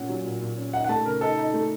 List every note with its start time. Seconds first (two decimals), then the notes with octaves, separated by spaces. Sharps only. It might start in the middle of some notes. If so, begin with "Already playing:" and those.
Already playing: A#2 C#4 F#5
0.09 F#3
0.25 A#2
0.42 A#2
0.57 C#4
0.73 D#4 F#5
0.84 F#5
0.89 A3 A5
1.05 C#3 A#4
1.21 D#4 A4
1.38 D#4
1.54 A3